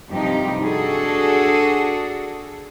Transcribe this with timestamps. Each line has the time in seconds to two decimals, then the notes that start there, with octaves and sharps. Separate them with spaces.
0.11 G2 C3 F3 D#4 G4
0.62 D4 F#4 G#4 A4